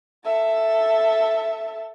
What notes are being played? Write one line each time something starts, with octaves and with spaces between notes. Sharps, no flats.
A4 E5